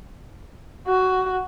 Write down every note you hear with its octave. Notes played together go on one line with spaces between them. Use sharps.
F#4